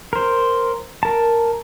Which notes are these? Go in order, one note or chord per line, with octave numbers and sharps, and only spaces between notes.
A#4 C5
A#4 A5